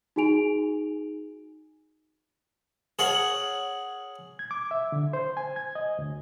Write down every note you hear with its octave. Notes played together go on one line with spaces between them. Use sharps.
D#4 F#4 G#4 G#5 D7 F7
G#4 A#4 C#5 F#5
G#6
D6
E5
D3
C5
G#5
G#6
D#5
D2